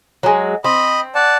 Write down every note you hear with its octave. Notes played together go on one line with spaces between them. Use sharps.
F#3 G#3
C4 D#5 B5
D5 F#5 A5